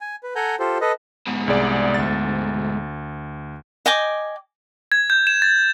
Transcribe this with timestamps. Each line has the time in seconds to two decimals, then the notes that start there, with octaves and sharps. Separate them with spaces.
0.01 G#5
0.23 B4
0.36 A4 F#5 G#5 A#5 G6
0.59 F4 G4 A4 C5
0.81 A4 B4 D#5
1.27 G#2 B2
1.48 C2 G#4 D5
1.94 D2 A6
3.86 D#5 G5 G#5 D6
4.92 G#6
5.10 G6
5.27 E7
5.42 A6